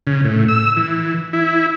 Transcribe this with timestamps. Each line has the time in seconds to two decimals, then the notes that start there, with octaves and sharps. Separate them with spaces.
0.07 C#3
0.25 A2
0.48 E6
0.76 E3
1.33 E4